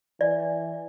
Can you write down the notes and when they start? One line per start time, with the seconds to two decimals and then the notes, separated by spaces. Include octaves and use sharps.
0.21 E3 D5